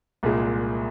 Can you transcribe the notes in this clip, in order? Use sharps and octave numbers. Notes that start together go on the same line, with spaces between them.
C2 A#2 G#3